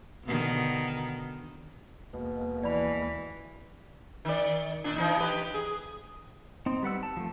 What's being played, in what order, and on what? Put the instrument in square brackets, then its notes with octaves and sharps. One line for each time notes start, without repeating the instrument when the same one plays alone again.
[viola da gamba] B2 D3 D#3
[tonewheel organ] D#2 G#3 A#3 [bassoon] B2
[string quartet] E3 [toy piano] D5 B5
[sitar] D#3 D5
A#2 D4
E3 G3 D#4
G4 B4
G#4
[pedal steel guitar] C4 D#4
G3 B4 F#5 E6
A5
F3 A3